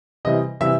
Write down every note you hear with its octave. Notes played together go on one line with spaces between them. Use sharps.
C3 E3 G3 D#5
C3 E3 G3 E5